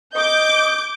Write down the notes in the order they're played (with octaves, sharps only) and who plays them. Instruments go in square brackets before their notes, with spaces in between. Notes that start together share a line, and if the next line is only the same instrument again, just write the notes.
[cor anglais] D#5 [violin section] D6 G6